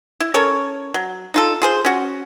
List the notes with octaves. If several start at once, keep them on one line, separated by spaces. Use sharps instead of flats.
E4
C#4 A4 A#4 C#5
F#3
D#4 F4 A4
F4 G#4 C5
C#4 F#4